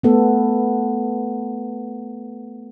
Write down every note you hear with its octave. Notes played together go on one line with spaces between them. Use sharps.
A3 B3 A4